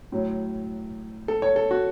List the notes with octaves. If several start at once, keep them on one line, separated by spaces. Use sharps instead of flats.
A2 F#3
A4
C#5
A4
F#4